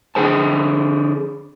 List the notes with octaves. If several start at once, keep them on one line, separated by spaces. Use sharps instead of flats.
D3 G#4 C5 A5